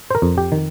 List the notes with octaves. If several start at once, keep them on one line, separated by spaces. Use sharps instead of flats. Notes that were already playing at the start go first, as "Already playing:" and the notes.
C5
A#4
F2
G4
D#3